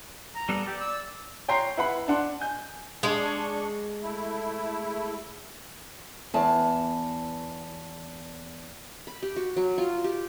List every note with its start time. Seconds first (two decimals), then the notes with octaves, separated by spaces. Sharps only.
0.34 A#5
0.49 G3 B3 A4
0.66 G4 D5
0.79 E6
1.48 C#5 G5 A#5 C6 C7
1.77 E4 B4 F#5 B5
2.08 D4 F#5 C6
2.41 G#5 G6
3.03 G#3 D4 C#6
4.02 A3 E4
6.34 E2 A5
9.07 B5
9.23 G4
9.36 F#4
9.56 F#3
9.78 F4
10.04 G4